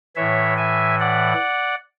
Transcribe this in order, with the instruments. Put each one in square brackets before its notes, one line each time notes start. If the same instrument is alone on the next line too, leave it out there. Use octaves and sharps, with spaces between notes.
[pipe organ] A2 E3 C#5 E5
E5 G#5
D5 F#5